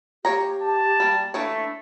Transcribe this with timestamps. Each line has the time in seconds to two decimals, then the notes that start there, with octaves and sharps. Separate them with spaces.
0.25 A#3 G4 C#5 A#5
0.62 A5
1.00 G3 A#3
1.34 E3 A3 A#3 D4 C#5